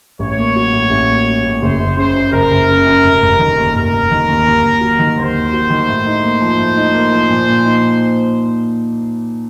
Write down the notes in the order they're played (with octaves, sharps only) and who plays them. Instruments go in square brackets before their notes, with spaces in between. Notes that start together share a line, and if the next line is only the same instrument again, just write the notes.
[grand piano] A1 [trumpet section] C#5
[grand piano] A#3
F#3
A2
A1
A#3
F#3
A2
[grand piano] F#1 [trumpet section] C5
[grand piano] F#1
[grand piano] C#3 [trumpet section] C5
[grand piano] F#2
[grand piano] F#1 [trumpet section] A#4
[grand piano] F#1
C#3
F#2
F1
F1
D#3
D#2
[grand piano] F1 [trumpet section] A#4
[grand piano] F1
D#3
D#2
D#2
D#2
F#3
D#3
[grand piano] D#2 [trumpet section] C5
[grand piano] D#2
F#3
D#3
A2
D#4
A#3
F3
A2
D#4
A#3
F3
A#2
A#2
D#4